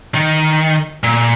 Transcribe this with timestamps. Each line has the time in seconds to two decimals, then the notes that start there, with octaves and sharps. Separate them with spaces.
0.15 D#3
1.03 A#2